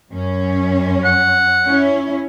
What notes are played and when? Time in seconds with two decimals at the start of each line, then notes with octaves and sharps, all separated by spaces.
0.11 F#2 C#4
1.05 F#5
1.67 C#4 E4